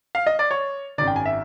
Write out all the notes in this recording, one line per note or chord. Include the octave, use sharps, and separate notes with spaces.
F5
D#5
D5
C#5
G#1 F#2 D#3 D5
G5
G#5
E5